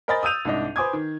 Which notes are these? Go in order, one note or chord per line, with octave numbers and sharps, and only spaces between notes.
A#4 C5 D#5 G#5 B5 A6
D#6 E6 G6 D#7 F7
C2 G#2 D4 D#5
B4 C5 G#5 D6 D#6 G#6
D#3